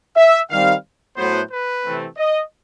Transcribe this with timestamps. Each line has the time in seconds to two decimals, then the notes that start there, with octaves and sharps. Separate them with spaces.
0.16 E5
0.50 D#3 G3 C4 F5
1.17 A2 F#3 B3 C5
1.50 B4
1.83 C3 E3 A3 C4
2.17 D#5